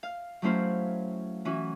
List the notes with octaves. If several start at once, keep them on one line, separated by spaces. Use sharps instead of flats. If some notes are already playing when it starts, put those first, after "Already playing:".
F5
F#3 A3 C#4 E4 C5 F5
E3 C#4 E4 F#4